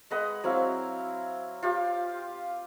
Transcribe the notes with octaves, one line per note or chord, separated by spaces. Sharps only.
G#3 B4 D#5 F#5
F#3 C4 E4 F5
F4 G4 F5